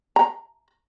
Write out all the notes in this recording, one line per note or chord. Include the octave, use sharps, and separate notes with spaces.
A#5